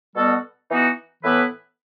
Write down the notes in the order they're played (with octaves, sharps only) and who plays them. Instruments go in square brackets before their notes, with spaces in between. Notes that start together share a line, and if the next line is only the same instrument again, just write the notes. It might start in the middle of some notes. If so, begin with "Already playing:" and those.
[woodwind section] B2 G3 B3 F#4 A4
E3 B3 D#4 F#4
A2 E3 B3 E4 B4